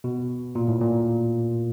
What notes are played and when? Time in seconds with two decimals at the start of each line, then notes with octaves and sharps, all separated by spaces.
0.04 B2
0.55 A#2
0.68 A2
0.81 A#2